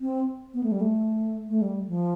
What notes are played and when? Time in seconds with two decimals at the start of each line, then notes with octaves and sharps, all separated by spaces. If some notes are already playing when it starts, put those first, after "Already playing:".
0.01 C4
0.54 B3
0.63 A3
0.72 G3
0.81 A3
1.49 A3
1.62 G3
1.88 F3